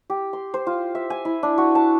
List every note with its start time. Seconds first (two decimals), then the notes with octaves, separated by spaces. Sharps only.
0.10 G4
0.33 C6
0.54 C5
0.67 F4
0.95 E5
1.10 G#5
1.25 E4
1.43 D4
1.58 F#4
1.75 A5